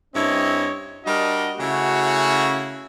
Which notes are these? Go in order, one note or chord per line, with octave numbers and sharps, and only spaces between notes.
G2 C4 C#4 E4 C#5 D#5
G3 D4 F#4 A#4 D#5
C#3 A3 C#4 E4 F#4